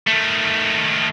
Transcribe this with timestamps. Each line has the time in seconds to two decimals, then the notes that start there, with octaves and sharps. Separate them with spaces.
0.07 D#3 A3